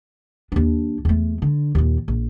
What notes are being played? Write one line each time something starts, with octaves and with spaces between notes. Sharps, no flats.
D#2 D4
E2 A3
D3
D#2 A#2
A#1